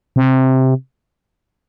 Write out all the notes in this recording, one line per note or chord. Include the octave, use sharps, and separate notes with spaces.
C3